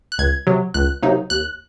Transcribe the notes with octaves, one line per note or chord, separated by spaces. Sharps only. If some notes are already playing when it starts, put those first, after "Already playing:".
F#6
C#2 G#6
C3 F#3
C#2 F#6
C3 F#3 A#3 D#4
D#2 F#6